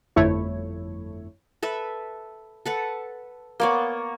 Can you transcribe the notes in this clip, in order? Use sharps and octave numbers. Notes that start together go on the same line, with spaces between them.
G1 F2 A3 E4 C#5
A4 B4 E5
A4 B4 F#5
A#3 B3 C#5 D5 C6